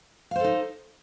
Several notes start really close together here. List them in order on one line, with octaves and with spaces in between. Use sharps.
F5 C5 A4 D#4